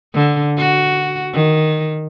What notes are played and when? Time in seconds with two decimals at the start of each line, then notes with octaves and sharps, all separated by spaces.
0.15 D3
0.58 F#4
1.34 D#3